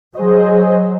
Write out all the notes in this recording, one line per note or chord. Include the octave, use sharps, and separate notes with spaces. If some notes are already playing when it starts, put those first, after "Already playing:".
F#3 G#4 C5 D#5